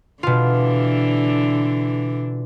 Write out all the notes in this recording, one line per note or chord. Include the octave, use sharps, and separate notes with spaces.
B2 D3 E3 D4 F4